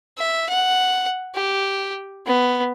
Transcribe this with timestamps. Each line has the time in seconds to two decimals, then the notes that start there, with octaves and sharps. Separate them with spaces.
0.17 E5
0.49 F#5
1.34 G4
2.26 B3